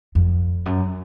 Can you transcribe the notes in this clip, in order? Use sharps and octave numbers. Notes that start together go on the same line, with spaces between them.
F2
F#2